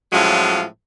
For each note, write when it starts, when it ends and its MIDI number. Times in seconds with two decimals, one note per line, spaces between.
0.12 0.64 45
0.12 0.64 53
0.12 0.64 54
0.12 0.64 56
0.12 0.64 61
0.12 0.64 65